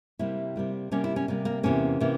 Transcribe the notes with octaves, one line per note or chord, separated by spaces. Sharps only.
C3 G3 A#3 E4
C3 G3 A#3
C3 G3 A#3 C#4
E4
C#4
C3 G3 A#3
A#3
E2 C3 E3 A#3 C#4
C3 E3 A#3